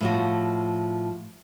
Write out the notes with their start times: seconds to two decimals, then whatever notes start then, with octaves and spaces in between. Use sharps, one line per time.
0.01 A2 F3 F#4